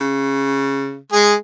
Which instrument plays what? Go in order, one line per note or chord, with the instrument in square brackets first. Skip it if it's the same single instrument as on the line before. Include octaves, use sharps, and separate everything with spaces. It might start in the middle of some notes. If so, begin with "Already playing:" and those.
[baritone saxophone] C#3
[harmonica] G#3 G#4